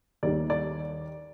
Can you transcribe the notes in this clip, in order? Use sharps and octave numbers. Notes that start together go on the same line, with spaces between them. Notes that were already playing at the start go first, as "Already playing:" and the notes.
D#2 D#3 G3 D5
D5